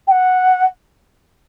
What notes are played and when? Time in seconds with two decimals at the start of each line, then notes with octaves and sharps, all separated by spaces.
0.07 G5
0.11 F#5